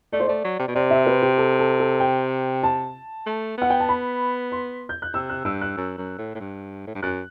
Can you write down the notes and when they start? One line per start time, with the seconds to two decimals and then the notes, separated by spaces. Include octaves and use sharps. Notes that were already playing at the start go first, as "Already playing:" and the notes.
0.13 A3 D5
0.20 C5
0.27 A3 D5
0.44 F#3
0.59 C3
0.68 B2
0.75 C3 D5
0.91 E5
1.06 B4
1.22 G4
1.37 A4
1.59 A4
1.79 A4
2.00 G5
2.63 A5
3.27 A3
3.58 B3 F#5
3.70 G5
3.80 A5
3.89 B5
4.52 C6
4.89 G6
5.02 F#6
5.14 C3 E6
5.29 F#6
5.45 G2 E6
5.61 F#6
5.77 F#2
5.98 F#2
6.18 A2
6.35 A2
6.40 G2
6.87 A2
6.95 G2
7.02 F#2 F#6